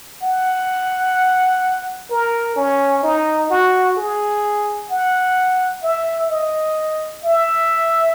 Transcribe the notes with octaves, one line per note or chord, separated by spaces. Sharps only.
F#5
A#4
C#4
D#4
F#4
G#4
F#5
E5
D#5
E5